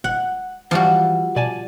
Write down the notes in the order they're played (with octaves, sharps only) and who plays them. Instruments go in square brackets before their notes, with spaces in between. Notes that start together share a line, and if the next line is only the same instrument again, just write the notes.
[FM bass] D#1 [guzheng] F#5
[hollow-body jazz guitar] E3 [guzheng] F3 G3 F#4
[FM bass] B2 [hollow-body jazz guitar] D5 G#5 A5